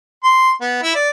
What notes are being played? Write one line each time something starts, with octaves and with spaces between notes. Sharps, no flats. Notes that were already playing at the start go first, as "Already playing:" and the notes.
C6
B3
E4
D5